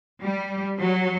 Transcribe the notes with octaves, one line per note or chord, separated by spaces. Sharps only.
G3
F#3